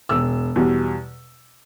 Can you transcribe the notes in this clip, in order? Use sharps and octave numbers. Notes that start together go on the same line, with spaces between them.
E1 E6
E2 B2 G3